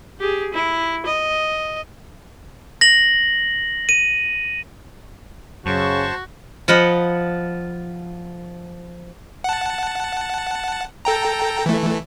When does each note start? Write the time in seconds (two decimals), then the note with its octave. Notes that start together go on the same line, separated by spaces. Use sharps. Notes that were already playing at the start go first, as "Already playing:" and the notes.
0.20 G4 G#4
0.54 E4
1.06 D#5
2.81 A#6 F#7
3.89 D#7
5.66 F#2 C#3 F#4 C5 A5 C#6
6.68 F3 D#5 F#5 B5
9.44 F#5 A5
11.05 A4 G5 A#5
11.66 E3 A3